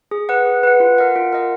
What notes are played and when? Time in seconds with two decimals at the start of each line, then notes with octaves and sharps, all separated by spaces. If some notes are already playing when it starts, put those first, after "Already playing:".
0.11 G#4
0.29 B4 F#5
0.46 G#4
0.63 B4 F#5
0.80 F4
0.98 A#4 D#5 F#5
1.16 F4
1.33 A#4 D#5 F#5